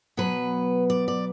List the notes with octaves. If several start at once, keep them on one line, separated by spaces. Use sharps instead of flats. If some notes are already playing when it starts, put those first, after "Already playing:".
B2 F#3 B3 B4
D5
D5